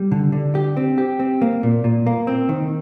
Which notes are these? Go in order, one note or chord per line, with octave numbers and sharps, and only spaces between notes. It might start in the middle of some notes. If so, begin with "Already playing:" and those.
Already playing: G3
D3
D3
G4
C4
G4
C4
A#3
A#2
A#2
A#3
C4
D#3